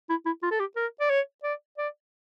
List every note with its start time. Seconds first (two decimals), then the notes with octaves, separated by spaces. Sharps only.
0.10 E4
0.26 E4
0.42 F4
0.51 A4
0.60 G4
0.76 A#4
1.00 D5
1.10 C#5
1.43 D5
1.78 D5